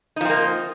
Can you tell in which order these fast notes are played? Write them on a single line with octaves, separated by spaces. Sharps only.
D#4 F3 C4 A#3